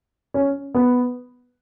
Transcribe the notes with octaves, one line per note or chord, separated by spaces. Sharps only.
C#4
B3